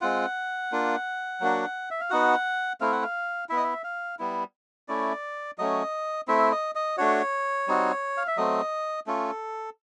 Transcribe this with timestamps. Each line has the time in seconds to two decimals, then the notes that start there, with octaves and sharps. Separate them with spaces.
0.01 G#3 C4 F4 F#5
0.72 A#3 D4 F4
1.41 F#3 A#3 D4 F#4
1.91 E5
2.01 F5
2.10 B3 D#4 F#4 F#5
2.81 A3 C4 E4 F5
2.92 F#5
3.02 F5
3.49 B3 E4 E5
3.57 D#5
3.64 E5
3.84 F5
4.19 G3 B3 E4
4.88 A3 C#4 E4 D5
5.58 F#3 A3 C#4 D#5
6.28 A3 C4 E4 E5
6.52 D#5
6.75 D#5
6.98 A3 D4 F#4 C#5
7.68 G3 C4 D#4 F#4
8.17 F5
8.27 E5
8.37 F#3 A3 C4 D#5
9.07 A3 C#4 F4 A4